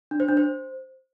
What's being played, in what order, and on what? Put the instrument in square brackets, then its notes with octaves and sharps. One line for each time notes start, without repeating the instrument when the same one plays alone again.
[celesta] D4
C5
D4
C5